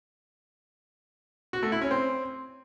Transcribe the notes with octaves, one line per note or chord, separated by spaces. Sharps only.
F#4
A3
E4
C#4
C4